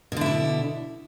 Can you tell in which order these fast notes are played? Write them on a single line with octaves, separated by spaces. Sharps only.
B2 D3 E4 D4